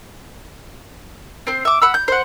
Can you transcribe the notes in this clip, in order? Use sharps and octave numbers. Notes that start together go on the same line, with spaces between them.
C4 C5
E5 D6
F#5 B5 E6
G6
C5 F#5